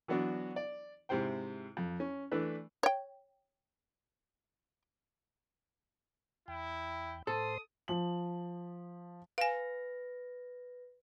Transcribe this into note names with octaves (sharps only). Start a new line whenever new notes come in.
E3 F#3 B3 D4 F#4
D5
G#2 C3 E4 C5 G5
F2
C#4
E3 A3 D4 B4
C#5 G5
E2 E4 G5
A2 A4 C5 C6 D#6
F3 F#7
B4 F5 G#5 A#6